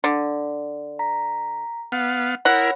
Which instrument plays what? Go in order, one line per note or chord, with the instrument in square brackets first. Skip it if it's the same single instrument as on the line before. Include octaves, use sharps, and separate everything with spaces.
[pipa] D3
[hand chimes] A#5 B6
[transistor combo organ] B3 F5 [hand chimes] F#5
[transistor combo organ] E4 A#4 [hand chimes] C#5 B5 [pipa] F#5